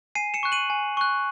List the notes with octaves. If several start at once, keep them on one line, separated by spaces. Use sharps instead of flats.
G#5 C7 D#7
C#7 E7
C#6 F#6
D#7 F#7
G#5
C#6 F#6